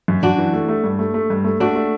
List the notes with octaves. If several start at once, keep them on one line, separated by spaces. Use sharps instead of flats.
F#2
F#2 D4 F#4
E3
A3
A3
G2
A3
A3
G2
A3
A3 D4 F#4
A3